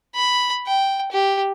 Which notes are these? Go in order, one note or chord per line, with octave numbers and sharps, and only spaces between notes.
B5
G5
G4